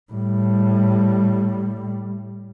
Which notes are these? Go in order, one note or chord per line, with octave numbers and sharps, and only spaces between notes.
A2 G3